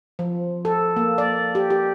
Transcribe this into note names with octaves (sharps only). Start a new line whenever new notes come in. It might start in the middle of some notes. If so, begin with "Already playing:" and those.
F3
A4
A#3
D5
G4
G4